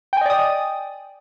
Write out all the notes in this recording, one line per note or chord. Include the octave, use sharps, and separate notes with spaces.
D5 D#5 G5 G#5 D#6